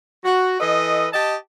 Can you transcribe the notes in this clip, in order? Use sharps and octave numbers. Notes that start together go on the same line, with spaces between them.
F#4
E3 A4 B4 D#5
G4 D#5 A5